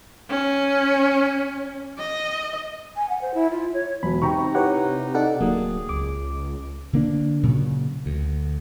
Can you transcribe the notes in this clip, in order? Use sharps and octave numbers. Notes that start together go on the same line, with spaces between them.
C#4
D#5
G#5
F#5
C5
E4
F4
C#5
E1 F#3 B5
C3 D#4 G5 A#5 C#6
E4 G4 B4 C#5 F#5
D#4 A4 D5 F#5
D1 F#3 A#3 G#4
C#2 D6
D3 A#3 D4
A#2 C#3 F#3
D2